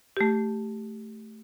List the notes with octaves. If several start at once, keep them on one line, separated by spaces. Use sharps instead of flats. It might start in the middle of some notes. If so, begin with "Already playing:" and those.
A3 G4